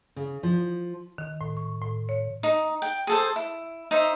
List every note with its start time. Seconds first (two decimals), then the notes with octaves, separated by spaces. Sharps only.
0.16 C#3
0.43 F3
1.18 D#3
1.41 A2
1.57 C#6
1.82 A2
2.09 C#5
2.43 D#4
2.82 G5
3.07 G#4 A4 C5
3.36 E4
3.91 D#4 C5 E5